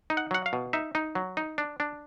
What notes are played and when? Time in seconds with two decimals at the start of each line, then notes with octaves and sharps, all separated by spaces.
0.10 D#4
0.17 F#5
0.31 F#3 F#5
0.46 F5
0.53 B2
0.73 D#4 E5
0.95 D#4
1.15 F#3
1.37 D#4
1.58 D4
1.80 D4